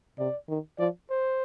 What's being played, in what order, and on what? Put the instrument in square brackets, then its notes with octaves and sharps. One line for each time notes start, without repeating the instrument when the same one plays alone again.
[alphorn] C3 [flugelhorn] D5
[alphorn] D#3
[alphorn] F3 [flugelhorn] D5
[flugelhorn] C5